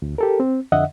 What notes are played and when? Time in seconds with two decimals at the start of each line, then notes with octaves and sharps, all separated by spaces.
0.02 D2
0.18 G4 A4 A#4
0.40 C4
0.72 F2 D3 D#5 E5 F#5